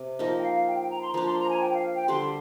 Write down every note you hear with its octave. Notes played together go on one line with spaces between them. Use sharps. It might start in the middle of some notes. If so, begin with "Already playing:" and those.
Already playing: C3
F3 A#3 D#4 D#5
G5
F5
G5
G5
A#5
C6
F3 A#3 D4 A#5
C6
A#5
G#5
G5
F5
G5
D3 G3 D4 C6